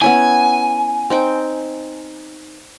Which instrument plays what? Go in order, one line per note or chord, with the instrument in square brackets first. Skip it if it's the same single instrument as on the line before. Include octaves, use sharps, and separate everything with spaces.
[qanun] B3 C#4 E4 [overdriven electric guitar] G#5
[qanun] C4 D#4 G5